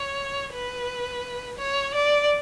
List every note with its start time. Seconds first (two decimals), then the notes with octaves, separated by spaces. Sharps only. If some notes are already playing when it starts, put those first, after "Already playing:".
Already playing: C#5
0.54 B4
1.58 C#5
1.94 D5